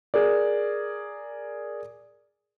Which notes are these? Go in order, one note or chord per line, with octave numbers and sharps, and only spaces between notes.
G#4 A#4 D5